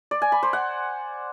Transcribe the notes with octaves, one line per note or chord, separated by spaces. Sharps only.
D5
G#5
B5
C5
F#5